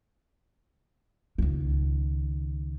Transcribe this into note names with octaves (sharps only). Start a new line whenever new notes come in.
C#2 D#3